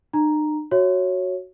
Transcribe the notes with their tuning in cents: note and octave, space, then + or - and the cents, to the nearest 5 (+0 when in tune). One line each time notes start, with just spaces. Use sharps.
D#4 -45 A#5 +0
F#4 +0 C#5 -5 E5 +0